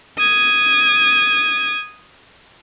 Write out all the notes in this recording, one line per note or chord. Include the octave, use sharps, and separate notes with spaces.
D#6 G#6